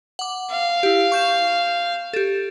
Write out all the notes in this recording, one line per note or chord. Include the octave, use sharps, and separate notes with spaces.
F#5 D6
F5
E4 G4
C#6 G6 E7
G4 A4